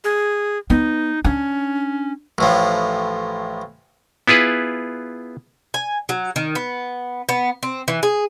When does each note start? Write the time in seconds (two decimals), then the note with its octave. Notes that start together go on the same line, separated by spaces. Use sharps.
0.04 G#4
0.70 B3 D#4
1.24 C#4 D4
2.38 A1 A2 F3
4.28 B3 E4 F4 G#4 B4
5.74 G#5
6.09 F#3
6.36 D#3
6.55 B3
7.29 B3
7.63 C4
7.88 E3
8.03 G#4